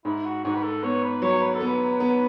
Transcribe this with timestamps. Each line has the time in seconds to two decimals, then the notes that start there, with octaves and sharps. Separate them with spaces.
0.05 G#2 E4
0.25 F#4
0.44 G#2 F#4
0.55 B4
0.63 A4
0.83 B3 C#5
1.03 B4
1.22 F#3 C#5
1.41 B4
1.55 A4
1.60 B3
1.67 B4
2.00 B3